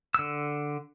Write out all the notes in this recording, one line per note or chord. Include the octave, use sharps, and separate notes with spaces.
D3 E6